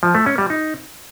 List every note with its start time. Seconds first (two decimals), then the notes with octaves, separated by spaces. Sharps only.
0.03 F3
0.15 A3
0.26 C#4
0.38 G3
0.50 D#4